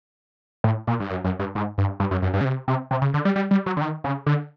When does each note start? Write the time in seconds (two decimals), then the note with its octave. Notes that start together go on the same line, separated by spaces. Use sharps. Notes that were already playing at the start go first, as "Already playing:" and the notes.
0.64 A2
0.87 A#2
1.00 G2
1.10 F#2
1.24 F#2
1.39 G2
1.55 G#2
1.78 G2
2.00 G2
2.11 F#2
2.22 F#2
2.34 G2
2.41 C#3
2.45 C3
2.68 C3
2.91 C3
3.02 C#3
3.14 D3
3.25 G3
3.36 G3
3.51 G3
3.66 F#3
3.77 D3
3.81 D#3
4.04 C#3
4.26 D3